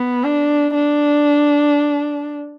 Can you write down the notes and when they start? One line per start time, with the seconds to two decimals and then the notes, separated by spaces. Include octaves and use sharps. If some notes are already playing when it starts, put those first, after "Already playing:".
Already playing: B3
0.23 D4
0.74 D4